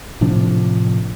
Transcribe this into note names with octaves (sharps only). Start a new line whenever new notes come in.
A2 C3 F3 D4